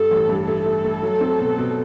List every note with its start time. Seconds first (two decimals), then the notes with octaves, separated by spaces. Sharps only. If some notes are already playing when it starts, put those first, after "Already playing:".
Already playing: G2 A4
0.11 A1
0.29 G2
0.48 A3 A4
0.66 A3
0.84 A3
1.03 F#3
1.21 C4
1.40 B2
1.58 B2